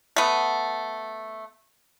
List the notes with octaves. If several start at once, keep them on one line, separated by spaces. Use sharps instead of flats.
A3 B3